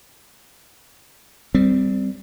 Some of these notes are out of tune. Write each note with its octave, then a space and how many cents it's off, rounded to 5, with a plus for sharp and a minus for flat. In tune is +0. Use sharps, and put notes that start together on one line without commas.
G3 +0 C4 -20